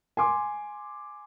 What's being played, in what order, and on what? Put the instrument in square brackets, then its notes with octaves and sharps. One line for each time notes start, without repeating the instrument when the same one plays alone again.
[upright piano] G#5 C6 D6